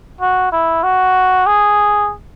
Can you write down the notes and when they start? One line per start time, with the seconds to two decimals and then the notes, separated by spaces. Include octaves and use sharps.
0.21 F#4
0.52 E4
0.83 F#4
1.46 G#4